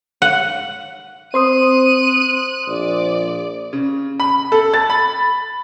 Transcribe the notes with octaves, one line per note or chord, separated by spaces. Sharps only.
F#5
C4 C5 C6 D#6 F#6 D#7
A#1 D5
C#3
B5
A4
A6
B5